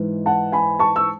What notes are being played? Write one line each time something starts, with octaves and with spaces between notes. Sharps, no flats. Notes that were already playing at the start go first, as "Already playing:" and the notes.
Already playing: G#2 E3
F#5 A5
G#5 B5
A5 C#6
E6